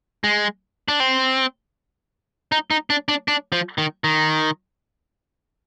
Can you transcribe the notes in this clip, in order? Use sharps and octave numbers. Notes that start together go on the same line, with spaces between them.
G#3
D4
C4
D#4
D#4
D4
D4
D4
F3
D#3
D#3